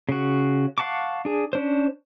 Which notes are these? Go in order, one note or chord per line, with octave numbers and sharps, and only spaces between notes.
C#3 F#4
F5 F#5 A5 C#6 D6
D4 G#4
C#4 D4 C5